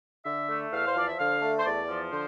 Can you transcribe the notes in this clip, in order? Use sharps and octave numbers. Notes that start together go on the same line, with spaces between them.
D3 E5
A3
E2 F5
C5
F3 D5
E5
D3 F5
A3
C5
E2 D5
F3
D3 C5